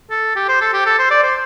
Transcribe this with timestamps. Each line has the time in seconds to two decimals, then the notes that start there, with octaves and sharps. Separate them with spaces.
0.11 A4
0.36 G4
0.49 C5
0.61 A4
0.73 G4
0.86 A4
0.98 C5
1.11 D5
1.23 C5